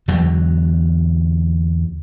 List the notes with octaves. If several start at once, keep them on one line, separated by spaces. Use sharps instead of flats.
E2 D3 F#3